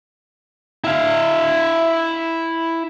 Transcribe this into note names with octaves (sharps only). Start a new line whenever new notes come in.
E4 F5